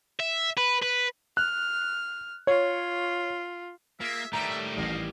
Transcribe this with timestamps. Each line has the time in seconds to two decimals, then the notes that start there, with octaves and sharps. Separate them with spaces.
0.20 E5
0.58 B4
0.83 B4
1.37 F6 F#6
2.47 F4 C#5
4.00 A#3 F4 G#4 E5
4.33 A2 D#3 G3 A3 G4 B4 E5 A#5
4.77 A1 D#5 F5